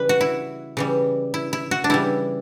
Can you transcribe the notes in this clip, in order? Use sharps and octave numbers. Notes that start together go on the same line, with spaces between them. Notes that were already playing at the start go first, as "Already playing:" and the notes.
Already playing: C#3 E3 G3 B4
F#4
E4
C#3 E3 G3
E4
E4
F#4
D4
C#3 E3 G3 E4